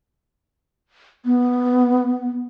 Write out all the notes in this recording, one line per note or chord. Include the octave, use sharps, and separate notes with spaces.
B3